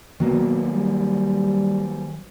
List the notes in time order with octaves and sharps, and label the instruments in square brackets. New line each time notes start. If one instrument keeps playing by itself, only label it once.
[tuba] B2 [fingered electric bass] D#3 F#3 A#3
[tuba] G3